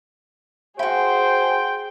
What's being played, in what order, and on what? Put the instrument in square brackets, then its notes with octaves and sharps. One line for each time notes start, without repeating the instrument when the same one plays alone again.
[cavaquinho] E4 F#4 [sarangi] G#4 [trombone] C5 [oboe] G5